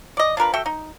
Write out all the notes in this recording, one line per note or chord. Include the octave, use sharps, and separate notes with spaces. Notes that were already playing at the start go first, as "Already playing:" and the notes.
D5 D#5
D4 F4 A#4 B4
F#4 A4 E5 G5
D#4